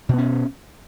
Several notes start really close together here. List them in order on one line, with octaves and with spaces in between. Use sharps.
B2 B3 C#4